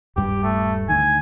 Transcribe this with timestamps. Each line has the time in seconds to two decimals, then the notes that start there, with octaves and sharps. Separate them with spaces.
0.16 D#1 G2 G3 G4
0.43 A3
0.89 D2 D#3 G#5